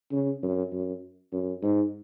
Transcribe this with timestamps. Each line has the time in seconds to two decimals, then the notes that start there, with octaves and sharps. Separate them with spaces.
0.12 C#3
0.43 F#2
0.73 F#2
1.32 F#2
1.62 G#2